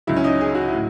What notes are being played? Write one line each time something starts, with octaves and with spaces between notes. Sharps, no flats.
C#2 C#3 F#3 E4
C#4
D#4
G#4
F#4
E4
A2 F#3